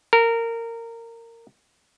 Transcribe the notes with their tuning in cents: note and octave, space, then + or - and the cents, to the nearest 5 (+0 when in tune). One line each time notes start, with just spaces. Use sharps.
A#4 -20